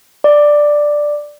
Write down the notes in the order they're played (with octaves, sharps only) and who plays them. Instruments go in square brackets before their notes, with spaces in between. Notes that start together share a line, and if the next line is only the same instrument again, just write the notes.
[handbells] D5